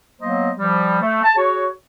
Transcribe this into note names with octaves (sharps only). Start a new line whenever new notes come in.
F#3 A#3 B3 C5 D#5
F3 G3
A3
A5
F#4 G#4 C#5